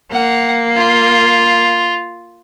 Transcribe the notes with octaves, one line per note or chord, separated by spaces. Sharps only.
A#3 F#5
F4